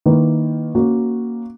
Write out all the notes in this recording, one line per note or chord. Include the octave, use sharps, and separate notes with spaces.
D#3 A#3 E4 B4
A#3 C#4 F#4